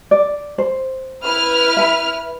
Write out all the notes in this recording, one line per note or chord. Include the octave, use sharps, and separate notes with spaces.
D5
C5
E4 B4 F6
E5 B5